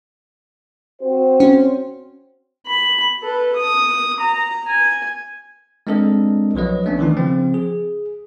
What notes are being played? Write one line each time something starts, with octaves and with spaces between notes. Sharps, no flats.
C4 F#4 C5
C#4
B5
A4 B4
D#6
A#5
G#5
G#3 C4 D4 A4 A#4 D#5
B1 F3 F#3 B4 D#5
A3 B3 C#4 D4
D#3 E3 D4 D#4
C#3 F3 C4
G#4